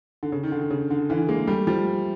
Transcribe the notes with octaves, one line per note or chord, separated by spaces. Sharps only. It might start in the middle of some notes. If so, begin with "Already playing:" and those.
D3
C#3
D#3
D3
D3
C#3
D3
D3 E3
G#3 A#3
G3 A3
F3 G3